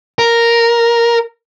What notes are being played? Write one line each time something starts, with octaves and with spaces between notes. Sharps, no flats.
A#4